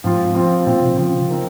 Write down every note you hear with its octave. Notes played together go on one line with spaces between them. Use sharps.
G#2 F3 C4 F4
F3 C4 F4
A#2 F3 C4 F4
C3
C#3 F3 C4 F4
C4 D#4 A#4